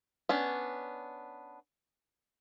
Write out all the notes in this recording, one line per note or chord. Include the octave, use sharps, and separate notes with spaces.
B3 C#4 D4